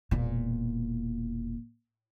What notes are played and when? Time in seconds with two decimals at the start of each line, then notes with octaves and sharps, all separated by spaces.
0.11 E1 A#2